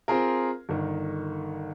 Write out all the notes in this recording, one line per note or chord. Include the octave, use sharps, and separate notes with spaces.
C4 F4 G#4 A#4
G1 D#3